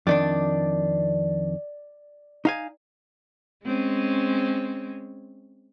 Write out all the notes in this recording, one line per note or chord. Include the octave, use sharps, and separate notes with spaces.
F2 D#3 D4 D5
D#4 F5 G#5
G#3 C4 C#4